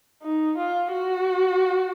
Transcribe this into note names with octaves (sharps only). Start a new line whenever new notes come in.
D#4
F4
F#4